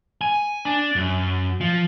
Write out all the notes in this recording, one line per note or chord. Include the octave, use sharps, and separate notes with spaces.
G#5
D4
F#2
F3